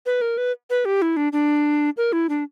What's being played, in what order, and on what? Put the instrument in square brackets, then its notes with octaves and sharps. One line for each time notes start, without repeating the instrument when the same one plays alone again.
[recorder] B4
A#4
B4
B4
G4
E4
D4
D4
A#4
E4
D4